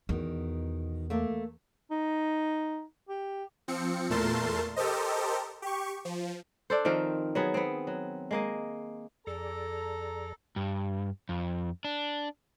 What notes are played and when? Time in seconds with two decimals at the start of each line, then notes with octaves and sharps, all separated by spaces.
0.09 E2 B2 D#3
1.10 A3 A#3 A4
1.91 D#4
3.09 G4
3.68 F3 C4 C#7
4.10 E2 A#2 A3 A#4 A5 C6
4.76 G4 A4 A#4 C5 D#5
5.62 G4 C#6
6.05 F3
6.70 D4 A4 C5
6.85 D#3 F3 C4 A#4
7.35 F#3 B3 G#4
7.54 B3 C4
7.87 F#3
8.31 G#3 A#3 D#5
9.27 F2 G#4 A4 D5 A#5
10.56 G2
11.29 F2
11.85 D4